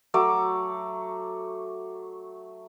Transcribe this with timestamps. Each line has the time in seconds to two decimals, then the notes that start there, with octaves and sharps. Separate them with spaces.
0.14 F#3 A3 D6